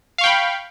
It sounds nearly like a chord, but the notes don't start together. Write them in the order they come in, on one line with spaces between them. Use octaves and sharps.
F5 C#6 G5 B5